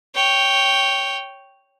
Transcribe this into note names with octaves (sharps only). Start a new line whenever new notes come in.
C#5 G5